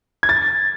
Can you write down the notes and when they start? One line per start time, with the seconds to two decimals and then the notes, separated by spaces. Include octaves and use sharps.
0.23 G#6
0.29 A6